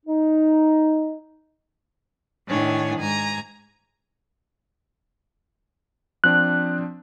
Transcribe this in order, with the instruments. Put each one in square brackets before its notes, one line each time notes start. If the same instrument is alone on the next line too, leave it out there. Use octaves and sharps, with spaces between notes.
[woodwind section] D#4
[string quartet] A2 D#3 D4 C#5 G#5
G#2 G#5 A#5
[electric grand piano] F3 C4 D4 [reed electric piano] F#6